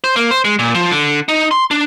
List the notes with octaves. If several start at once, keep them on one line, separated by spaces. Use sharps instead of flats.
C5
A#3
C5
G#3
A#2
F3
D3
D#4
C6
D4